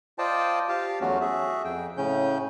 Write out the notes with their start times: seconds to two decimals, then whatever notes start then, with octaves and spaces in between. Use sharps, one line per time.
0.18 F4 C5 D5 D#5 G5 A5
0.69 F4 G4 F5 A5
1.01 E2 F#3 A3 C#4 F#4
1.21 F#4 G#4 E5
1.65 F2 G5
1.97 A2 C#3 C#4 G6